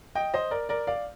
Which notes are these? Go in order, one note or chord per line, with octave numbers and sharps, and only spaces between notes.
D#5 G5
C5 D#5
A#4 D5
A#4 D5
D5 F5